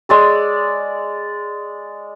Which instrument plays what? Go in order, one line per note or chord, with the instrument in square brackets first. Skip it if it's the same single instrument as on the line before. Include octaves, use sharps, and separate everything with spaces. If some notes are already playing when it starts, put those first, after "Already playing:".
[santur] G#3 D5 E6